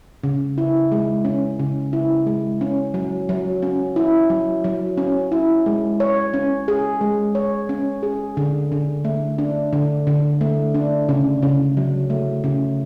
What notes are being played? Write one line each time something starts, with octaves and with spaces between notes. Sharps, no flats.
C#3
E4
G#3
C#4
C#3
E4
G#3
C#4
F#3
F#3
C#4
E4
F#3
F#3
C#4
E4
G#3
C#5
C#4
G#4
G#3
C#5
C#4
G#4
D3
D3
A3
D4
D3
D3
A3
D4
C#3
C#3
F#3
A3
C#3